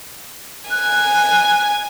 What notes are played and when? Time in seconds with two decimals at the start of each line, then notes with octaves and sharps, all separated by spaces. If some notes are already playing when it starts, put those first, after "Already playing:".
0.70 G#5 F#6